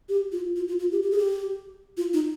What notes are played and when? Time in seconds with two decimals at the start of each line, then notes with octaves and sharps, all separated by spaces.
0.09 G4
0.32 F4
0.56 F4
0.68 F4
0.79 F4
0.92 G4
1.03 G4
1.11 G#4
1.18 G4
1.97 F4
2.13 D#4